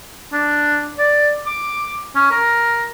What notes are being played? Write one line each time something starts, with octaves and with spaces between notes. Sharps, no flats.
D4
D5
D6
C#4
A#4